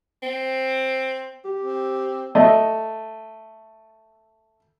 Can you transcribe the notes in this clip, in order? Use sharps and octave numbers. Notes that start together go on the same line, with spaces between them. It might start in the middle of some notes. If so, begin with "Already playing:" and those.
C4
G4
C4
A3 D#5